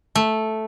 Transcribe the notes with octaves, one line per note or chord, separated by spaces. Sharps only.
A3